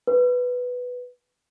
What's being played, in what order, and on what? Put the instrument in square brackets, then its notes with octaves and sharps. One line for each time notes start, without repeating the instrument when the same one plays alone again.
[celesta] B4